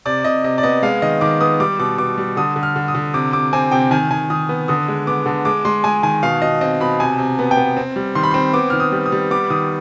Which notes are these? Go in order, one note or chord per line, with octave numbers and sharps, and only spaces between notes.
C3 D5
C3 D#5
C3 D#5
D5
B3 D#5
G#3 F5
D#3 D#5
D#3 D6
B3 D#6
G3 D6
B2 D6
B2 D6
G3
D3 D#6
D3
F6
D3
D#6
D3
C3 D6
C3 D6
C4 G#5
C3 G5
D#3 G#5
D#3 G#5
D#3 D#6
B3
D3 D#6
G#3
B3 D6
D3
G#3 D6
G#3 C6
G#3 G#5
D#3 G#5
B2 F5
B2 D#5
C4 D#5
B2 B5
C3 G#5
C3
B3
G5
B3
C4
G3
D#3 C6
B5
C4 C6
B3 D6
D#3 F6
D#6
G3
D#6
G3
B3 D6
D#3 D#6